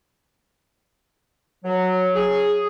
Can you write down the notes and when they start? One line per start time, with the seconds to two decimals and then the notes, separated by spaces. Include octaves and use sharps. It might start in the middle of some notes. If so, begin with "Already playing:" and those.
1.64 F#3
2.15 G#4